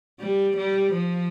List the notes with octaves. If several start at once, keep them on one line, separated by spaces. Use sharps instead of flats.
G3
G3
F3